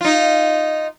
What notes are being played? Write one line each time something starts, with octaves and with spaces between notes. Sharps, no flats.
D#4 F4